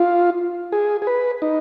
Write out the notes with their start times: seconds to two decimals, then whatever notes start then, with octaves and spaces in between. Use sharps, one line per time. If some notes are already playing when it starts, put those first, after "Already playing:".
Already playing: F4
0.72 G#4
1.02 G#4
1.07 B4
1.42 D#4